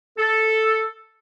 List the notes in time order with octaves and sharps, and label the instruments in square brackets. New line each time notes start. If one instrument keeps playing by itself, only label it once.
[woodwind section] A4